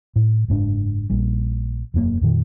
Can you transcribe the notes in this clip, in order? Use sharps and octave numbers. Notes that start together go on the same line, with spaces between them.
A2
F#1 G#2 C#4 D4
A#1 A#2 G3
E1 F#2 G#3 A#3
F2 A#2 D#3